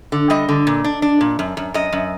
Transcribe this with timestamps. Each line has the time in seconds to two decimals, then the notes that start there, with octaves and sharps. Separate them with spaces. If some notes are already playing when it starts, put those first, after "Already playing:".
0.12 D3
0.30 G3 D#5
0.49 D3
0.67 A#2
0.84 D4
1.02 D4
1.21 A#2
1.39 F#2
1.57 F#2
1.74 F#2 D#5
1.93 F#2